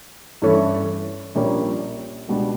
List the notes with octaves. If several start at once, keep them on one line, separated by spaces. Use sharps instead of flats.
G2 E3 A3 C#4
A#1 A#2 G3 A#3 C#4
C#2 B2 G3 B3 D4